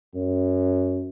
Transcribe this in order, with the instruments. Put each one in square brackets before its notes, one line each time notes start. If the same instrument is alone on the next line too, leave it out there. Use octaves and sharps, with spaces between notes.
[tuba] F#2